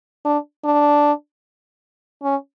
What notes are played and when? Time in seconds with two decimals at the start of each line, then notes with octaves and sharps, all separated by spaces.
0.25 D4
0.65 D4
2.23 C#4